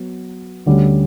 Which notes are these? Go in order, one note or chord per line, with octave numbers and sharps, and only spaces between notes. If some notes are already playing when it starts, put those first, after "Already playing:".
Already playing: F#3 B3
D2 D3 G3 C#4